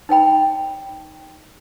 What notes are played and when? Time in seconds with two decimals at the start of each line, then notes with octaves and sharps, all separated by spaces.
0.09 D#4 C#5 G5 B5